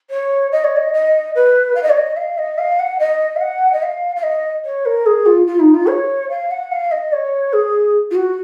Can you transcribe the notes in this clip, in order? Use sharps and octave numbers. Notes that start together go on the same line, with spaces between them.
C#5
D#5
C#5
D#5
D#5
B4
F5
D#5
C#5
D#5
F5
D#5
F5
F#5
D#5
F5
F#5
D#5
F5
F5
D#5
C#5
A#4
G#4
F4
F4
D#4
F4
C#5
F5
F#5
F5
D#5
C#5
G#4
F4
F#4